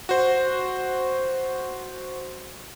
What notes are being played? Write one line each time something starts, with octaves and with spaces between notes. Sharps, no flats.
F#4 C5